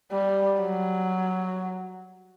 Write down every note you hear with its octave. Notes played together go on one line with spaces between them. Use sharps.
G3
F#3